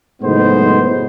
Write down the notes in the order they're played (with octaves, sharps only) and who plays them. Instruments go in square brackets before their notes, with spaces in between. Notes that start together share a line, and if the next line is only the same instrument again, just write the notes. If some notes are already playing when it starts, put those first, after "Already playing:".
[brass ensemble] F#1 A2 G#3 B3 D#4 C5